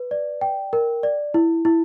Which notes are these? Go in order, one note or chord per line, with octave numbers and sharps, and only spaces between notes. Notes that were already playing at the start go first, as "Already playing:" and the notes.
Already playing: B4
D5
G5
A#4
D5
E4
E4